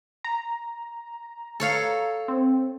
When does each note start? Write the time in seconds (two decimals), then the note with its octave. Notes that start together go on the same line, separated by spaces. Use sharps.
0.24 A#5
1.60 A4 C#5 F5
2.28 C4